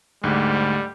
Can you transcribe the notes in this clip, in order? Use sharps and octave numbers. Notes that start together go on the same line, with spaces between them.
D2 G#2 G3